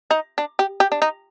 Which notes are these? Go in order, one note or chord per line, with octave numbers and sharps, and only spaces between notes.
D#4
D4
G4
G4
D4
D#4